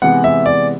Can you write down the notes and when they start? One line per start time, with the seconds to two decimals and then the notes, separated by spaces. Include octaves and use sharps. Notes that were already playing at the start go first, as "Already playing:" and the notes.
0.02 C3 E3 G#3 B3 F#5
0.24 E5
0.46 D5